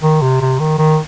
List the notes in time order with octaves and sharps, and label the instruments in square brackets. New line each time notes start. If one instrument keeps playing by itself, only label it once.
[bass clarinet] D#3
C3
C3
D#3
D#3